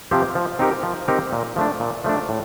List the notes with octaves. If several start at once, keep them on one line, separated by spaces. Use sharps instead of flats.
C3 F3 C4 G4
F3
C4 D#4 G4 A#4
F3
C4 D#4 G4 A#4
A#2
F3 A3 D4
A#2
F3 A3 D4
A2